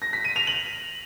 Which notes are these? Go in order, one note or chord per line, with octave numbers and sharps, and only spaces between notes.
A#6
B6
D#7
F7
F#7